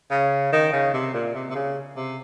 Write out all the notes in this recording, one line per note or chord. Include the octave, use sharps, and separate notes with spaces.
C#3
D#3
C#3
C3
A#2
C3
C3
C#3
C3